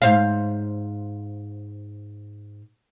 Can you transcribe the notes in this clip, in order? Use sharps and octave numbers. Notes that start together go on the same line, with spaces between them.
G#2 C5 F5